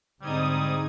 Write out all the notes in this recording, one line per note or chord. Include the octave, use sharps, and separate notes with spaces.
G#2 D3 G3 C4 D#4 D#6 G#6